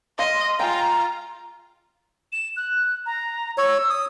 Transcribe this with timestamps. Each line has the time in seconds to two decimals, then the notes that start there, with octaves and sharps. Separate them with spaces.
0.19 D#5 F5 C6
0.59 G#3 F4 G5 A#5
2.32 E7
2.57 F#6
3.06 A#5
3.58 C#5 E6
3.90 D#6